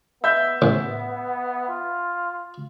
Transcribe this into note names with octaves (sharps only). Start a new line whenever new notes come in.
B3 E5 G6
A1
F4